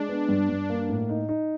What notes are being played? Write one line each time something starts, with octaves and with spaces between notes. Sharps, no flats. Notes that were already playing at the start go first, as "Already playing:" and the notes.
Already playing: G#3 D4
B3
G2
G2
A#3
A2
D#4
D#4